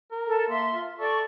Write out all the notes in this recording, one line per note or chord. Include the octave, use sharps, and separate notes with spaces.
A#4
A4
A#3 E5 C6
F4
A4 D5 C#6